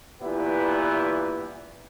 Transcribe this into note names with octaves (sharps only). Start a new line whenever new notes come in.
G2 A#2 E3 B3 E4 G4